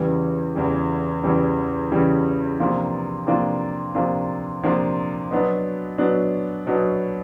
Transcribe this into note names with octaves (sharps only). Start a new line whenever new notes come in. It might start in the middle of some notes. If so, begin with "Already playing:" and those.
Already playing: E2 C#3 E3 G3
E2 C#3 E3 G3
E2 C#3 E3 G3
E2 C#3 E3 G3
C3 F3 A#3 D4 F4
C3 F3 A#3 D4 F4
C3 F3 A#3 D4 F4
C3 F3 A#3 D4 F4
B2 F#3 B3 D4
B2 F#3 B3 D4
B2 F#3 B3 D4